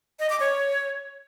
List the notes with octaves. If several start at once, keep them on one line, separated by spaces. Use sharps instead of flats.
D#5
D6
C#5